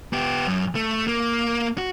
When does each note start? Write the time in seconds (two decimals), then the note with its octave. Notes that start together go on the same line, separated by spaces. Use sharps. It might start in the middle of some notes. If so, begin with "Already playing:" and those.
0.13 B3 G4
0.47 F#2
0.75 A3
1.08 A#3
1.78 F#4